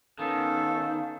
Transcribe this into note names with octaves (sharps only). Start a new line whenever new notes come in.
D#3 B3 C#4 A4 F5